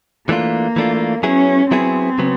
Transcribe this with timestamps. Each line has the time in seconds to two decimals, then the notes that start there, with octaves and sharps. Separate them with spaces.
0.28 E3 A3 A#3 D4 F4
0.76 E3 A3 D4 F4
1.23 F#3 B3 C#4 E4 G#4
1.71 F#3 B3 C4 E4 G#4
2.18 C#3 F#3 B3